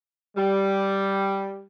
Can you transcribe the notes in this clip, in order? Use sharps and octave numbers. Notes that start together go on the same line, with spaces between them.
G3